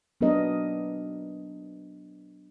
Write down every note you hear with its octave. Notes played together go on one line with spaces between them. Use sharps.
F#3 B3 D4 A#4 D#5